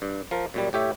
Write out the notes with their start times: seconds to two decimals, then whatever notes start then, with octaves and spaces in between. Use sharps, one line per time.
0.02 G2
0.31 F3 A#4
0.54 F#2 A#2 G3
0.73 A2 G4 C#5 E5